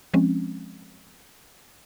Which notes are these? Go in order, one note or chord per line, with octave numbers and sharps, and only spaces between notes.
F3 G#3 C4 C#4